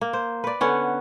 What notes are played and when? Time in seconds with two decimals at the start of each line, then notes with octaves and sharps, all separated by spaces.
0.01 A#3
0.13 C5
0.44 B4 D5
0.61 D3 B3 C#4 F#5